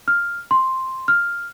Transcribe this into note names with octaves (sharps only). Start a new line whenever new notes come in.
F6
C6
F6